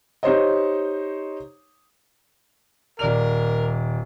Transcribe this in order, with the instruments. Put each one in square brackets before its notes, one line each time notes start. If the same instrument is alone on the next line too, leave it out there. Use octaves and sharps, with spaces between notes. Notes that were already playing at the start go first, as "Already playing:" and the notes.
[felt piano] D#4 G4 C5 C#5 D#5
[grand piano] D#1 D5 F7 [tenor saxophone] A#4